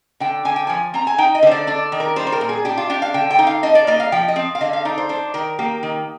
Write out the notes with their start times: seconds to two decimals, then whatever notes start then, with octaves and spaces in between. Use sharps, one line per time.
0.20 D3 G5
0.45 D3 G#5
0.56 G5
0.67 F3 G#5
0.94 C4 A#5
1.07 G#5
1.18 D#4 G5
1.35 D#5
1.43 D3 C5
1.51 D5
1.67 D4 D5
1.92 D#3
2.00 A#4
2.16 G3 C5
2.27 C5
2.32 A#4
2.41 A#2
2.49 G#4
2.65 D4 G4
2.77 F4
2.90 D4 G4
3.02 F5
3.14 D3 G5
3.31 G5
3.39 D#4
3.47 F5
3.63 D4 D#5
3.75 D5
3.87 A#3 D#5
4.00 F5
4.12 F3 G5
4.28 D#5
4.36 C4
4.55 F5
4.61 D3 D#5
4.73 F5
4.85 D#4 D5
4.98 C5
5.09 D4 C5
5.34 D#3 A#4
5.59 A#3 G4
5.83 D#3